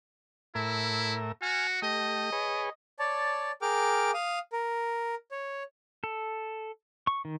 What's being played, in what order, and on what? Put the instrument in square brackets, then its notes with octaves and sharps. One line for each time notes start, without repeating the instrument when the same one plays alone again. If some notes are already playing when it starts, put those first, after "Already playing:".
[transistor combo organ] A2 A#4 E5 [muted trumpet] E4
[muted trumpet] F#4 [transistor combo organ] G#5 F6
[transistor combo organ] A3 G4 [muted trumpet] D#5
[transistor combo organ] G#4 B4 C#5
[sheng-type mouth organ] C#5 D5 A5
G#4 A#4 G5 D6 F6
F5 D#6
A#4
C#5
[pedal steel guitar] A4
C#6
D#3